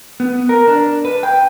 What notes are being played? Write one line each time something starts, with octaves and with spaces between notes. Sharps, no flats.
B3
A#4
D4
B4
G5